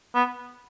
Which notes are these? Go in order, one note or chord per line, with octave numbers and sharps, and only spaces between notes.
B3